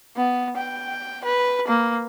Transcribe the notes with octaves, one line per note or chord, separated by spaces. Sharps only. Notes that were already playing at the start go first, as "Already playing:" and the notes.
B3
G5
B4
A#3